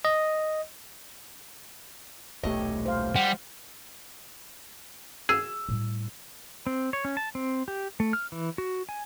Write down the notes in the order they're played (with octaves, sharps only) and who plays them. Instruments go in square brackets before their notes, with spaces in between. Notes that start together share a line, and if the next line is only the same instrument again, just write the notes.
[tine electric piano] D#5
[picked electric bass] D#1 B1 A3 [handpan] G4 C#5 [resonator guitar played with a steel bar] D#5
[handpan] C5 F5
[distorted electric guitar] G3 [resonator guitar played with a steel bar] F#5
[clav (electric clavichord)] G#4 [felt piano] E6
[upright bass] A2 G3
[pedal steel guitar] C4
C#5
C#4
A5
C4
G4
A3
F6
E3
F#4
G#5